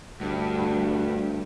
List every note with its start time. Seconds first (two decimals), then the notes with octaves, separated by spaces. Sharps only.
0.21 D2 G2